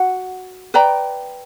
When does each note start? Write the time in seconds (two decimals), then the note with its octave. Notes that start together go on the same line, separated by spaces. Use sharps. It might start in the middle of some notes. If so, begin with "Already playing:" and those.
Already playing: F#4 F#5
0.74 B4 D5 G5 A#5